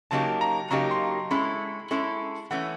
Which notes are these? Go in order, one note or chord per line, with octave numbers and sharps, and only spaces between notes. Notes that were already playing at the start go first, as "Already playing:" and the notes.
C#3 F#3 A#3 D#4 G4 A5
A#5
C#3 F#3 A#3 D#4 G4 A#5
C6
C6
G#3 C#4 E4 A4 B5
G#3 C#4 E4 A4
E3 A3 C#4 F#5